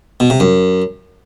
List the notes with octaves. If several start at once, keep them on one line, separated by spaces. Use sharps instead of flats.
B2
C3
F#2